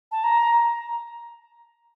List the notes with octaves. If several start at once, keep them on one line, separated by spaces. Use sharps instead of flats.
A5
A#5